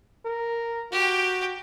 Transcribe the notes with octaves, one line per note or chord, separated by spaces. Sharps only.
A#4
F#4 G4 G5